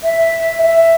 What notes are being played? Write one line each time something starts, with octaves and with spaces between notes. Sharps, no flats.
E5
E5